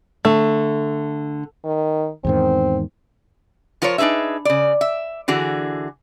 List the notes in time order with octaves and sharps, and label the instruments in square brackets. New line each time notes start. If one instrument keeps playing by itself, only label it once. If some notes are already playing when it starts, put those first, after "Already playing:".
[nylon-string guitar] D3 [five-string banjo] A3
[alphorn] D#3
[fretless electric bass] E2 G#2 D#3 [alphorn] C4
[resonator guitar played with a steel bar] F3 F4 A#4 C5 C#5
D4 D#4 G#4 B4 E5
C#3 D5
E5
D3 E3 F#4 G#4